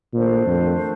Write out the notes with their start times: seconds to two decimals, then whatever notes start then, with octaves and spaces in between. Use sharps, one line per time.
0.14 A#2 D#3 A3 D4 A4 C5
0.47 F2